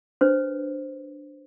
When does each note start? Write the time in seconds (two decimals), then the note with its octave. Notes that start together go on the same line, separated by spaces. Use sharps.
0.21 D4 B4 C5